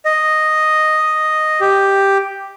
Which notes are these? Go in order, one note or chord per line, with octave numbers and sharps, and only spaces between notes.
D#5
G4